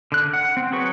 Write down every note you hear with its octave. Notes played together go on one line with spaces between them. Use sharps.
D3 F#6
F#5
C4
F#3 G#4 B4 C#6